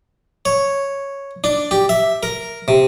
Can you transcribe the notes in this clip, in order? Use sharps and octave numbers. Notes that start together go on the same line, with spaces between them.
C#5
D4
G4
E5
A#4
C3